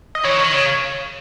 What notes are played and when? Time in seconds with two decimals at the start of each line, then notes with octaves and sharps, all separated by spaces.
0.15 D#5
0.24 E3 C#5
0.38 D#3
0.51 C#3 C#5